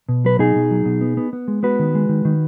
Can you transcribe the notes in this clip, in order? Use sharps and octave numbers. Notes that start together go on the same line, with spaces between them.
B2
F#3 B4
B2 D#4 G#4
B2
F#3
B2
B3
B3
B3
G#3
B3 F#4 B4
D#3
G#3
D#3
D#3